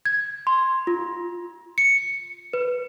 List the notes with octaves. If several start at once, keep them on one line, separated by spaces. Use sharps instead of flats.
G#6
C6
F4
C#7
B4